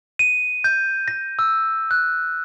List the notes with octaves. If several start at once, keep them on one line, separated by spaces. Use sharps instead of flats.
D#7
G6
A#6
E6
F#6